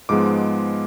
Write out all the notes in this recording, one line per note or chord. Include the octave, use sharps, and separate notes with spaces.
G#2 F3 G#3 B3 D6